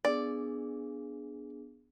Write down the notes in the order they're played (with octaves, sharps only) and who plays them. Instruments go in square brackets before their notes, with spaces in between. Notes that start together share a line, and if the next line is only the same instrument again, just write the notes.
[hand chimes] B3 D4 G#4 [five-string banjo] D5